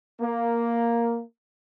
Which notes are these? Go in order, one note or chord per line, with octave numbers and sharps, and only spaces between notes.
A#3